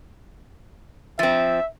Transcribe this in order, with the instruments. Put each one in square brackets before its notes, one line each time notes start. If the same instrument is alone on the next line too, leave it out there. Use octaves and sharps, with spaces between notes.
[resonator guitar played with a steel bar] F3 C4 [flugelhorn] E5